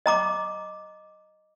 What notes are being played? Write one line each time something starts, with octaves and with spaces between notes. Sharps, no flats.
D#5 A#5 D6